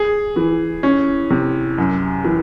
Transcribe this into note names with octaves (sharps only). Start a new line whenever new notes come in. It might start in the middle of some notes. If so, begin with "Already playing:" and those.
Already playing: G#4
E3
C#4
C3
F#2
E3